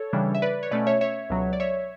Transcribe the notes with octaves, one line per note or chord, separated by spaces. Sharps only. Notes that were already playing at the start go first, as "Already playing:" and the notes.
Already playing: A4 C#5
C#3 E3 G3 D4
E5
B4 D5
C#5
B2 A3 C#4 B4 D5
C#5 E5
C#5 E5
C#2 B2 F#3
D5
C#5 E5